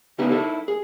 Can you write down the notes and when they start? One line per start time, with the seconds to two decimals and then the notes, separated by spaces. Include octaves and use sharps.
0.18 C#3 B3 D#4 E4 G4 B4
0.31 D#4 E4 A4
0.68 G#4